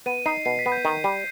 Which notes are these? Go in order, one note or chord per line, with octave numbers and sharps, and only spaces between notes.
B3 D#7
D#4 C7
B2 C7
B6
B3
G6
D#3
G3